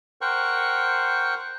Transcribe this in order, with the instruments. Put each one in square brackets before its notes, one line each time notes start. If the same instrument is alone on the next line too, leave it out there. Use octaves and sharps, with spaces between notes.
[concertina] A#4 C5 F#5 G5 C#6